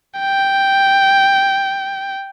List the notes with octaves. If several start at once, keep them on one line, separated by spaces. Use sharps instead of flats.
G5